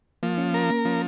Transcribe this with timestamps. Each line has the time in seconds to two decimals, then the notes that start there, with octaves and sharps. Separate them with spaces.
0.23 F3 A#3
0.38 C#4
0.54 C#4 A#4
0.70 A#3
0.85 F3 C#4